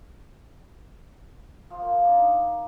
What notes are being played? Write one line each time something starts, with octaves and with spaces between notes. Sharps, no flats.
F3
A#3
A#3
D4
D#4